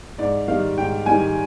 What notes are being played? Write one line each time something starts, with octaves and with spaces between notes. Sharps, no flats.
G#2 D5
D#3 G3 F5
G#2 G5
D#3 G3 G#5